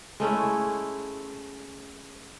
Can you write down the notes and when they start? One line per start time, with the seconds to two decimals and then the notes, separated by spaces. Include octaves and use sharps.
0.20 G#3 A3 C#4 E4